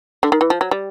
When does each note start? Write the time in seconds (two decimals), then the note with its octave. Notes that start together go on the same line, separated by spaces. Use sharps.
0.23 D3
0.32 D#3
0.41 E3
0.50 F3
0.61 F#3
0.71 G3